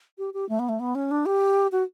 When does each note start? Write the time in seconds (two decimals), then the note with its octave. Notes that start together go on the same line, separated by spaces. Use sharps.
0.18 G4
0.34 G4
0.49 A3
0.59 B3
0.69 A3
0.80 B3
0.95 C#4
1.11 D4
1.26 G4
1.72 F#4